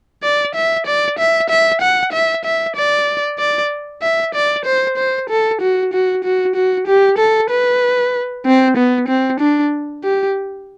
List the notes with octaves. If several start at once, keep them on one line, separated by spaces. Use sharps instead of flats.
D5
E5
D5
E5
E5
F#5
E5
E5
D5
D5
E5
D5
C5
C5
A4
F#4
F#4
F#4
F#4
G4
A4
B4
C4
B3
C4
D4
G4